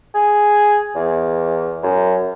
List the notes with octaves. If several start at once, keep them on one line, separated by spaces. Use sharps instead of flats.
G#4
E2
F#2